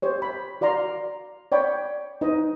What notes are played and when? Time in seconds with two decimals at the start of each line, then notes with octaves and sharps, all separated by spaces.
0.02 G4 C5 C#5
0.22 B5
0.61 F#4 D5 F5 A#5 C6
1.52 C#5 D5 G5 B5
2.21 D#4 B4 C5 D#5